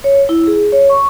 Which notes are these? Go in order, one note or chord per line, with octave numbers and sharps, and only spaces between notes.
C#5
E4
G#4
C#5
C#6